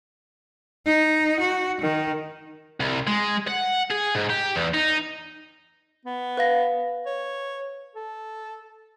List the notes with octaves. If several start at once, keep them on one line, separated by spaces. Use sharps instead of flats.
D#4
F#4
D#3
C2
G#3
F#5
G#4
G#2
G4
E2
D#4
B3
B4 F5 A#6
C#5
A4